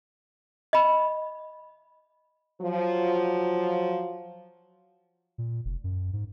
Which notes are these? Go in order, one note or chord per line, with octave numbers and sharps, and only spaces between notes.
D#5 B5
F3 F#3
A#2
F1
F#2
G#2